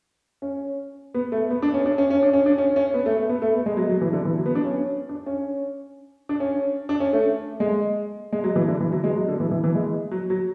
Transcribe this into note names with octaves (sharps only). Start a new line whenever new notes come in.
C#4
B3
A3
B3
D4
C#4
D4
C#4
C#4
D4
C#4
D4
C#4
C#4
B3
A3
A3
B3
A3
B3
G#3
F#3
F#3
E3
D3
E3
F#3
B3
D4
C#4
D4
C#4
D4
C#4
D4
C#4
A3
G#3
G#3
F#3
E3
D3
E3
F#3
G#3
F#3
D3
E3
E3
E3
G#3
F#3
F#3